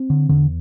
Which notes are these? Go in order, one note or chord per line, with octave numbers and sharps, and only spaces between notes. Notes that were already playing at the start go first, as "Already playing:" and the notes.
Already playing: C4
D3
E2 D3